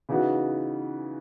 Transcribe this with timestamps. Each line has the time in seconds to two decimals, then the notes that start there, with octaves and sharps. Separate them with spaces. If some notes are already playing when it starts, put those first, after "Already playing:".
0.09 C#3 E3 B3 D#4 F#4